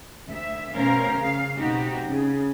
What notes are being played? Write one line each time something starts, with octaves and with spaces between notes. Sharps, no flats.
D2 E5
B2 A3 C#4 A#4 C5 F5
C#3 F5
B2 A3 C4 D#4 F#4 G4
C#3